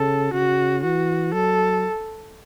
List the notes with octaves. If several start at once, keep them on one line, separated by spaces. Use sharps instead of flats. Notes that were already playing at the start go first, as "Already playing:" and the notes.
Already playing: C#3 A4
C#3 F#4
E3 F#4
F#3 A4